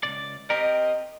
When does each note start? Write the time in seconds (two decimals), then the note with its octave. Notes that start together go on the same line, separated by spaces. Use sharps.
0.03 C#2 B2 D5
0.50 C4 G4 A#4 D#5